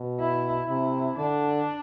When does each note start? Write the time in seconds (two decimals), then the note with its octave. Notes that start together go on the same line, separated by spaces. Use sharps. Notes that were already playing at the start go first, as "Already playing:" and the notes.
Already playing: B2
0.20 E4
0.69 C3 E4
1.17 D3 D4